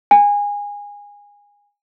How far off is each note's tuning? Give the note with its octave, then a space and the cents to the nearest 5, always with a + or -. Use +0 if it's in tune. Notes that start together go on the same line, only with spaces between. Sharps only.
G#5 -20